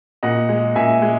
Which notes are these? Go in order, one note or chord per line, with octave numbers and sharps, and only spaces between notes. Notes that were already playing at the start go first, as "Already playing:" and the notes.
A#2 D#5 F#5
G#3
A#2 E5 G#5
G#3